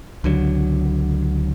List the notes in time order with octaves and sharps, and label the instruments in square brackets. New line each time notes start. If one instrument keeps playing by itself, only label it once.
[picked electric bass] C#2 D3 F#3